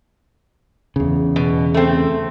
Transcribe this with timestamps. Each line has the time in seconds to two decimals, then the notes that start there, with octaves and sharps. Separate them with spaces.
0.96 E2 C#3
1.36 B2
1.74 A3 C4